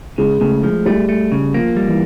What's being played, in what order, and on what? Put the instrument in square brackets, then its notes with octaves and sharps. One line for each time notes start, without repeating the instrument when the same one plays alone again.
[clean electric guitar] C#3 [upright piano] G#3
[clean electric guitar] C#3 [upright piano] A3
[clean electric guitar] F3 [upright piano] G#3
[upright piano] G3 [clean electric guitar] A3
[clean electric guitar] A3
C#3
[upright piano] F3 [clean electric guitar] A#3
[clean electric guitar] G3
[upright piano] E3